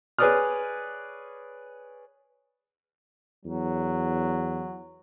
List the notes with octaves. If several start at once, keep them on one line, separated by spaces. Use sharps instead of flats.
G#4 B4 C#5 D5 D#6 F6
E2 F#3